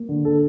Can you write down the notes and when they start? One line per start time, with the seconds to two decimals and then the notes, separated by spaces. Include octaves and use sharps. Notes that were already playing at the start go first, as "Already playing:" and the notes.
Already playing: A#3
0.09 D3
0.25 A4